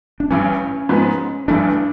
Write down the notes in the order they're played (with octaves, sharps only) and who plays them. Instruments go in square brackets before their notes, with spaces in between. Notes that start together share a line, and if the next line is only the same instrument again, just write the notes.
[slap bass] D4
[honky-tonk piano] A1 G2 E3 [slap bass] C#4
[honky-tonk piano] G#2 F3 G#3 B3
[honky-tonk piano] A1 G2 E3 A3 [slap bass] D4